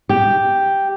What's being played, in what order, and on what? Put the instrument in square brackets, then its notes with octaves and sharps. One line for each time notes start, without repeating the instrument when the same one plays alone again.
[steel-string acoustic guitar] G4